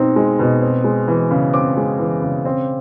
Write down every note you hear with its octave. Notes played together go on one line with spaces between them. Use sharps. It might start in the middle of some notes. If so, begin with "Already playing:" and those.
Already playing: B2 C4 D#4
G#3
B2
C4
G#3
E3
C#3
C4 D6
G#3
E3
C#3
C4